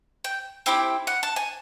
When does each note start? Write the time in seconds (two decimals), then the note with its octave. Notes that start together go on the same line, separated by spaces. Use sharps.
0.24 G5
0.66 C4 E4 G4 G5
1.07 F#5
1.23 A5
1.36 G#5